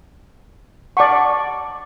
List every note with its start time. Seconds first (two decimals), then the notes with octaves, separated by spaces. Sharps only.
0.97 D5 F#5 A5 C#6 D6